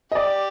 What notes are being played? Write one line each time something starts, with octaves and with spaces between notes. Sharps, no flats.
D#5
G4 D5